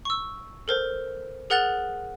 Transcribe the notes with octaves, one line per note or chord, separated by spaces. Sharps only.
C#6 E6
A4 A#4 C5
G#4 A#4 F#5 F#6 A6 F7